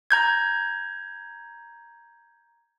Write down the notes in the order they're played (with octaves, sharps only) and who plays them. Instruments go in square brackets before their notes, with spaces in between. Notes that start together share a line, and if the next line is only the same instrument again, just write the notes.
[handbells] A#5 G6 G#6